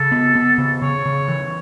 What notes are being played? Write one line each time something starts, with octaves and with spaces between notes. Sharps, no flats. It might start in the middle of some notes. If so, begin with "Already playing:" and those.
Already playing: C#3 A4
B3
B3
C#3
C#3 C#5
C#3
E3